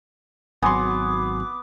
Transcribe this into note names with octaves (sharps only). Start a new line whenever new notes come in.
G#1 F#3 B3 G#5 C6 D6